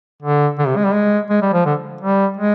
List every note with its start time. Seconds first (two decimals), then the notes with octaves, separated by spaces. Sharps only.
0.22 D3
0.59 D3
0.67 C3
0.76 G#3
0.85 G3
0.94 G#3
1.30 G#3
1.42 G3
1.53 F3
1.65 D3
2.01 G3
2.37 G#3